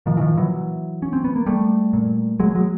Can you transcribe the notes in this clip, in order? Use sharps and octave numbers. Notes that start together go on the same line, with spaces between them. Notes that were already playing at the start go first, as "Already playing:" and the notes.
A#2 D#3 F3
E3
D#3 F3
E3 F#3
C#4
C4
B3
A#3
G3 A3
A#2
F#3 G#3
F#3 G#3